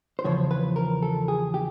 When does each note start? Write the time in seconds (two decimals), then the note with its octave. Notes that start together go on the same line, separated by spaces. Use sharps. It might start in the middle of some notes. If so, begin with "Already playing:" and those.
0.19 C5
0.24 E2 C#3 F3 C#5
0.51 B4
0.76 A#4
1.02 A4
1.28 G#4
1.54 G4